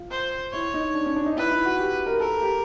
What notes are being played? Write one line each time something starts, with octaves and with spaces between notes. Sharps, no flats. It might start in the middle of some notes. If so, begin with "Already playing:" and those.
Already playing: F4
C5
E4 C#5
D#4
D4
C#4
D4
D#4
E4 B4
E4
F#4
G4
A#4
A4 A#4
G4